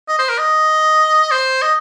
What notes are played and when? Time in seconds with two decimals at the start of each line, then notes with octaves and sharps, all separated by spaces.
0.08 D#5
0.19 C5
0.29 A#4
0.39 D#5
1.31 C5
1.62 D#5